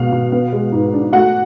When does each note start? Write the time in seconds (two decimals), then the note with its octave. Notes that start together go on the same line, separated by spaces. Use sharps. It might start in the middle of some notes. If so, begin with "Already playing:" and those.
Already playing: B2 G#3 F5
0.12 B2
0.32 B3
0.53 G#3
0.72 G#2
0.93 D4
1.13 A3 F#4 F#5